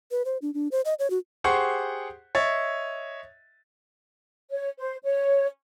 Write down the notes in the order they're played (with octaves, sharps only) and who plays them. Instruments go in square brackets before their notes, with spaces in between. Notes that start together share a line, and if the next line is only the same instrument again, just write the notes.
[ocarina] B4
C5
D4
D4
C5
D#5
C#5
F#4
[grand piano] G4 G#4 C5 F#5 C#6
C#5 D#5 E5 A6
[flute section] C#5
C5
C#5